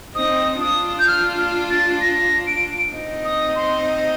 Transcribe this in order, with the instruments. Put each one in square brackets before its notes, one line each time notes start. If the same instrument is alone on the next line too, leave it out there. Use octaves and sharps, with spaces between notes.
[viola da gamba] C4 D#4 [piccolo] D#6
[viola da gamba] D4 F4 [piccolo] D#6
[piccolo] G6
F6
F6
A6
A#6
D7
[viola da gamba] C4 D#4
[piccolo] D#6
C6